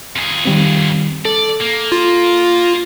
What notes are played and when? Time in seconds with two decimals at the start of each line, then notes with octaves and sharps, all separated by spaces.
0.16 F2 G#4
0.45 D#3 G3 C4
1.25 A4 D5
1.60 A#3
1.92 F4